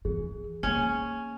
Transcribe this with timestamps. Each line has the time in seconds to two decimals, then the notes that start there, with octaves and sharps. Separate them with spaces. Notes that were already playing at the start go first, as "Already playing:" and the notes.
0.05 E3 G#4
0.63 A#3 C#4